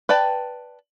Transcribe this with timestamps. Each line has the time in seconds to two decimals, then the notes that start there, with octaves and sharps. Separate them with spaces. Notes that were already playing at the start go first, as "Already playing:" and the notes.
0.09 B4 D5 G5 A5